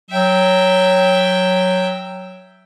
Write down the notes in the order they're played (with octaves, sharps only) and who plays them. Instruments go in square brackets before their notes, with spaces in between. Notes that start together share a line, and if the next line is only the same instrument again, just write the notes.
[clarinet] F#3 [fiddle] E5 G5